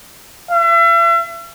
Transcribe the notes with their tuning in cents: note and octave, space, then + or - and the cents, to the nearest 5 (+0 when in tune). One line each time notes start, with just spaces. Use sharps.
E5 +40